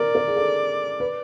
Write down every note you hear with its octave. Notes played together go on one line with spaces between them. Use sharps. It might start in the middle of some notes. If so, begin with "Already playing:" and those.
Already playing: A#4 D5
A#4
G#4
A4
B4